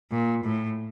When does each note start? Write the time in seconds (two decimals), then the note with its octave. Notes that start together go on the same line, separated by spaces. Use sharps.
0.11 A#2
0.44 A2